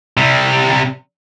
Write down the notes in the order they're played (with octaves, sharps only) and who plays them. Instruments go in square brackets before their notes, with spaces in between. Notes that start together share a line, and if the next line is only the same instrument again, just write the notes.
[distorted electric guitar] C3 G3